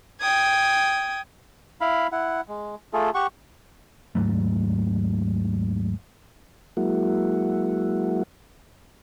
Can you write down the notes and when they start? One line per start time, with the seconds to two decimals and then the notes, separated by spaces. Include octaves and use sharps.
0.21 G5 D#6 G#6
1.81 E4 F5 B5
2.12 E4 F#5
2.48 G#3
2.93 A3 F4 G#4 A4
3.15 G4 F#5 C#6
4.15 D#2 G#2 F#3 A3
6.77 F#3 G#3 A#3 E4 F#4